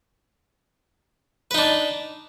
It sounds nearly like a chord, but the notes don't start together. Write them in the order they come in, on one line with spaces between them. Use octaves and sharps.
B4 D#4 D4